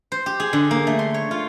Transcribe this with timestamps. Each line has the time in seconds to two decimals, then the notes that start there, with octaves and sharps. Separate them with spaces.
0.12 C5
0.26 G4
0.40 G#4
0.53 D3
0.71 A#3
0.87 A3
0.99 C6
1.14 C#5
1.31 F4